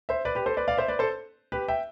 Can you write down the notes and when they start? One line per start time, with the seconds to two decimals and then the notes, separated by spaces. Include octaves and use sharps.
0.09 C5 E5
0.25 B4 D5
0.35 G4 B4
0.46 A4 C5
0.57 B4 D5
0.68 D5 F5
0.77 C5 E5
0.88 B4 D5
0.99 A4 C5
1.52 G4 B4
1.68 E5 G5